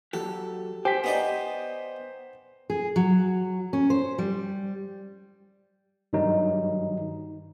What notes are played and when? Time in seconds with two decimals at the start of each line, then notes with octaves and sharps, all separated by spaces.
0.13 F#3 F#4 G4 A4
0.85 G4 C5 G#5 B6
1.04 B3 D#4 D5
2.70 G#4
2.96 F#3
3.73 C#4
3.90 C5
4.18 G3
6.13 G2 D#3 F#3 G3 D#4